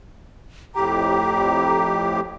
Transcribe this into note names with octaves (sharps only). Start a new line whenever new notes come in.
F2 A2 G4 A#5